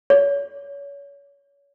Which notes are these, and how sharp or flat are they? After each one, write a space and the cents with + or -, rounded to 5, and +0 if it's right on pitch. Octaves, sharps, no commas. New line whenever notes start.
C#5 +30